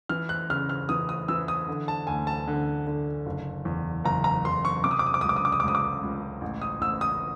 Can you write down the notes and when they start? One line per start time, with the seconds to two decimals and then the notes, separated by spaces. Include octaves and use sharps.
0.09 E3 F6
0.29 F#6
0.50 C#3 F6
0.69 F6
0.89 E3 D#6
1.09 D#6
1.28 E3 E6
1.48 D#6
1.68 D3
1.88 A5
2.07 D2 G#5
2.27 A5
2.48 D3
2.87 D3
3.26 F#1
3.65 E2
4.04 F#1 A#5
4.24 A#5
4.44 F#1 C6
4.65 C#6
4.84 C3 D6
4.91 D#6
4.99 D6
5.06 D#6
5.14 D6
5.21 C#2 D#6
5.29 D6
5.36 D#6
5.45 D6
5.52 D#6
5.60 D6
5.64 C#2 D#6
5.75 D6
6.03 C#2
6.41 A1
6.62 D#6
6.81 A1 E6
7.01 D#6